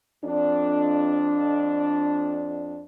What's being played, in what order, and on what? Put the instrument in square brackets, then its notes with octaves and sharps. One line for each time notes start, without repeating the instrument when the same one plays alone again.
[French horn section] F2 D4